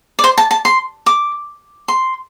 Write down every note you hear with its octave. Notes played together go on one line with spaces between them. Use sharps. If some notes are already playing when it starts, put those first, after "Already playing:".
D5
C5
A5
A5
C6
D6
C6